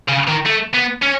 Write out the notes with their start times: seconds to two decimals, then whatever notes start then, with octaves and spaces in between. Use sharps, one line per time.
0.09 C#3
0.28 D#3
0.46 A3
0.74 B3
1.03 C#4